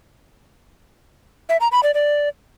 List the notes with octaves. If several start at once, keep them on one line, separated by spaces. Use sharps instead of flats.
E5
A#5
B5
D5
D5